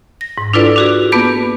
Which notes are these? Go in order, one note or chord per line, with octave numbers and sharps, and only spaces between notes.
A#6
G#2
D4 E4 F4 A4 B4 D5
D4 F#4 G#4
A#3 B3 B4 A5 D6 G6